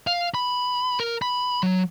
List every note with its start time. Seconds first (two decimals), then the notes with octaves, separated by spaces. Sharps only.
0.07 F5
0.34 B5
1.00 A#4
1.22 B5
1.63 F#3